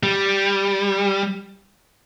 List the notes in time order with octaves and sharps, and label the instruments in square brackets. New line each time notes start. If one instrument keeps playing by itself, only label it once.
[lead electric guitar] G3